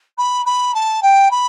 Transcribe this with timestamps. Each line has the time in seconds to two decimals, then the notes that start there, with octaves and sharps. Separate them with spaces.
0.18 B5
0.46 B5
0.74 A5
1.02 G5
1.31 B5